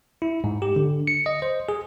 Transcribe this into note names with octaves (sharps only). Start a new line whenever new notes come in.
E4
G#2
G4
D3
C#7
D#5
C5
G#4